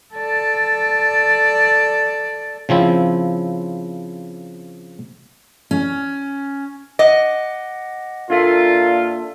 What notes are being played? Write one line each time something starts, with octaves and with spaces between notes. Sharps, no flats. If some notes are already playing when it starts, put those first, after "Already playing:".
A4 D5
C#3 F3 C4 E4
C#4
D#5 F#5 D6 A#6
A#2 D4 F4 A4 E5